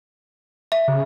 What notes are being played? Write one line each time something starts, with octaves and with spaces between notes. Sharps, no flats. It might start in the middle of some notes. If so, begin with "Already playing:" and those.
E5
C#3